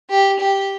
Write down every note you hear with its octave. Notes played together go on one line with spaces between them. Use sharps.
G4
G4